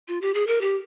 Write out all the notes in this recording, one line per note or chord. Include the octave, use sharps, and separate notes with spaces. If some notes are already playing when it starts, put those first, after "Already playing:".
F4
G4
G#4
A#4
G4